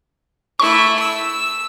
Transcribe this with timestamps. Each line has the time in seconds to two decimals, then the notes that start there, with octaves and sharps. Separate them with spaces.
0.60 A3 E4 C#6
0.99 E6